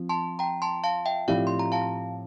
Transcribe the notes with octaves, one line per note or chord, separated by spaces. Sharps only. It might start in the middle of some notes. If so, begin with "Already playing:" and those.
Already playing: F3 C4
A5 C6
G5 A#5
A5 C6
F5 A5
E5 G5
A2 F3 C4 E4 G4 D5 F5
C6
A#5
F5 A5